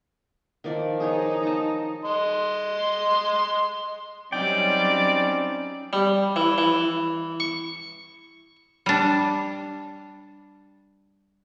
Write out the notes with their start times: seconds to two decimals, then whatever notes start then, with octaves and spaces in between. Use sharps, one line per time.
0.64 D#3 F3 D5
1.00 D#4 G#4 C5 C#5
1.43 A5 A#5
2.04 D#5 C6
4.33 F#3 G3 C4 C#4 D#4 D5 G5
5.93 G3
6.36 E3
6.58 E3
7.40 C#6
8.86 G3 D4